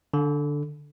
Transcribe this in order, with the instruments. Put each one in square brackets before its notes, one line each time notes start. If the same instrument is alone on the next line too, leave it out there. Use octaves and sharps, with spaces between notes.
[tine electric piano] D3